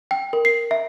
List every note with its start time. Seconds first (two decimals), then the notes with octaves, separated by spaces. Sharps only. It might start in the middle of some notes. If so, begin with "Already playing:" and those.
0.11 G5
0.33 A#4
0.45 C7
0.71 E5